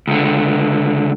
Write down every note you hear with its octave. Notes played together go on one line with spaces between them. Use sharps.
C#2 D3